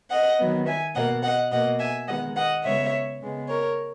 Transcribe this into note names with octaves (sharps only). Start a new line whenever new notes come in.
D#5 F#5
D#3 F#3 B3
E5 G#5
B2 D#5 F#5
A#3
D#5 F#5
B2 A#3 D#5 F#5
E5 G#5
D#3 G#3 B3 D#5 F#5
D#5 F#5
C#3 G#3 B3 C#5 E5
C#3 G#3 B3
A#4 C#5